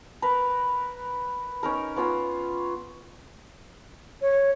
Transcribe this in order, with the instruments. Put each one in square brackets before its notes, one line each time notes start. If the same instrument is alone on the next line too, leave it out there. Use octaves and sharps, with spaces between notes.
[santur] A#4 B4
C#4 D#4 A#4
B3 C#4 F4 E6
[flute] C#5